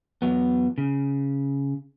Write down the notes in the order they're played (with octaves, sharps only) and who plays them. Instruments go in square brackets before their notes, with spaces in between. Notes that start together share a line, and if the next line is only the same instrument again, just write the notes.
[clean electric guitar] E2 F#3 B3
C#3